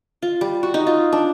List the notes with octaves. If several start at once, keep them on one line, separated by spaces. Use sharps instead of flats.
F4
G3
F#4
D#4
F4
D4